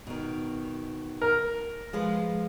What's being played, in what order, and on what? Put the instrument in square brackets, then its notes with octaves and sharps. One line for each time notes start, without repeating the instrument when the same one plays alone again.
[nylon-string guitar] B2 D#3
[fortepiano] A#4
[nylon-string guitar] F3 G#3 B4